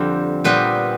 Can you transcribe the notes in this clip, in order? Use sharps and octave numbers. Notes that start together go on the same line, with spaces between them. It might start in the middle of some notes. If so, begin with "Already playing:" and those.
Already playing: F2 D3 G3 C4
A#2 G3 B3 C4 B4